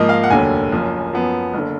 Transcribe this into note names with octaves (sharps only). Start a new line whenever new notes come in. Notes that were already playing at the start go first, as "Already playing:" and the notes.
Already playing: G#2 F3 A#3 D#5
F5
F#5
F1 D#2 D3 F#3 G#5
F#1 F#2 F3
F#2 F3 B3
F#1 D3